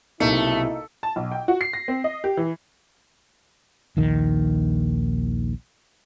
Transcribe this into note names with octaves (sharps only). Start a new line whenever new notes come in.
B1 C3 A3 A#3 D#4 E4 C#7
A5
B1
G5
F#4
C7
A#6
C4
D#5
G4
E3
A#1 D#2 D#3